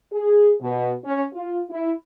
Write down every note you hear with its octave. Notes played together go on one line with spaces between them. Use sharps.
G#4
B2
C#4
F4
E4